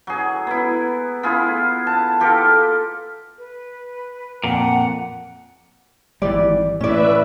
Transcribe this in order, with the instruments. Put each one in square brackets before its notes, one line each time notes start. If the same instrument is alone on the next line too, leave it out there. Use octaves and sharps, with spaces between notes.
[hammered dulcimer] F#3 G#4
B3 E4
B3 E4 F4 G#4
A5
F4 G4 A4 A#4
[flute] B4
[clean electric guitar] F2 A#2 [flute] F#5
[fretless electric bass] G#1 E3 G3 [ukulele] D5
[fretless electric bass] A2 E3 [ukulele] C#4 D5 [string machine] B4 E5